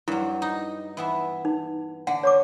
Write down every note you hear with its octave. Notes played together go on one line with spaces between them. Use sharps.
G2 F#3 E4
D#4
E3 B3 E5
D#4
D3 F#5
C#5 C#6 D6